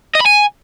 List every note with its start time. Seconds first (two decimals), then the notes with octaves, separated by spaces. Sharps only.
0.15 D#5
0.21 B5
0.26 G#5